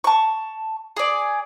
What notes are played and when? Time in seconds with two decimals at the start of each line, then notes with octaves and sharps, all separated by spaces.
0.04 A5 C#6
0.97 G#4 D5